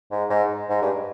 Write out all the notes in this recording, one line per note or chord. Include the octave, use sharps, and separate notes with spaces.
G#2
G#2
G#2
G2